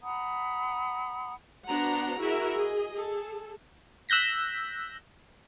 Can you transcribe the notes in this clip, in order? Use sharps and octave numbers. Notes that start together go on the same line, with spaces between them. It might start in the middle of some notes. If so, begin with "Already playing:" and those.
F#5 A#5 B5 D#6
B3 D4 F#4 C5 F#5 A#5
E4 F#4 G#4 A#4 E5
G#4 D#5
G#4 A4
E6 F#6 G6 A#6 B6